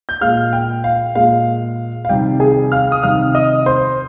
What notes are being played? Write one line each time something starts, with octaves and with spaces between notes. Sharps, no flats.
G6
A#2 G#3 F5 F6
G5
F5
A#2 G#3 F5
F5
C3 D#3 G3 G5
G#4 G#5
F5 F6
D#6
C3 D#3 G3 F5 F6
D#5 D#6
C5 C6